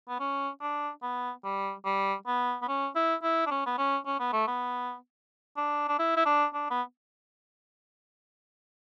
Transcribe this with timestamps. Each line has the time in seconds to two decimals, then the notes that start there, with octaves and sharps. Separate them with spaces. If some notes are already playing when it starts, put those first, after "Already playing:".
0.08 B3
0.20 C#4
0.61 D4
1.02 B3
1.44 G3
1.85 G3
2.27 B3
2.62 B3
2.68 C#4
2.95 E4
3.23 E4
3.46 D4
3.51 C#4
3.66 B3
3.78 C#4
4.06 C#4
4.19 B3
4.33 A3
4.47 B3
5.57 D4
5.88 D4
5.99 E4
6.17 E4
6.26 D4
6.54 D4
6.70 B3